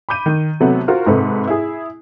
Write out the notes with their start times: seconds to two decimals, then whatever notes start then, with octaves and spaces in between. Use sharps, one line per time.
0.09 B5 D6 G6 D#7
0.26 D#3
0.60 C3 F#3 A3 B3
0.88 F4 F#4 A#4 C5
1.06 G#2 C3 A4 B4
1.47 E4 G#4